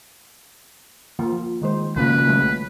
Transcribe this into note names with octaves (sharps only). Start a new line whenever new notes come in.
F3 A#3 F4
D#3 G#3 C5
A#1 C#3 F3 A#3 B4
F#3 G#3 A3